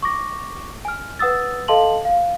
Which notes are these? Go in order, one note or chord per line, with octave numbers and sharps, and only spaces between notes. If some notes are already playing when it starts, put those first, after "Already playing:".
C#6 D6 A#6
G#5 F6
B4 F#5 D#6 E6 A6
A4 D#5 F5 A5 C6 F#7
F5